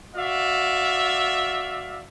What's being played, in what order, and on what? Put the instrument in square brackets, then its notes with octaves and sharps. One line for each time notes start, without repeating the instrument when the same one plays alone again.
[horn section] F#4 D5 E5 F5